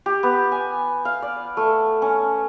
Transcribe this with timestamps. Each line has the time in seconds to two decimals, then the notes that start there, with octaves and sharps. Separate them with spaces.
0.06 G4
0.23 B3
0.52 G#5
1.05 F5
1.22 D5
1.57 A3
2.02 C#4